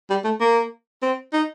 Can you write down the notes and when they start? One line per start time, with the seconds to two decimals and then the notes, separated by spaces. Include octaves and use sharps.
0.10 G3
0.24 A3
0.40 A#3
1.02 C4
1.33 D#4